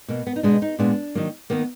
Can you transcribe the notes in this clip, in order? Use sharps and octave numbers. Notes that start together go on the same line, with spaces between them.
B2 A#3
B3
D#4
B2 G#3 B3 D4
D#4
A#2 G#3 B3 D4
D#3 F#3 A#3
D#3 A#3 B3